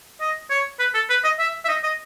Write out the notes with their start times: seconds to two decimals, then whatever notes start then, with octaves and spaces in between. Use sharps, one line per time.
0.21 D#5
0.51 C#5
0.80 B4
0.95 A4
1.10 B4
1.24 D#5
1.39 E5
1.65 E5
1.69 D#5
1.84 D#5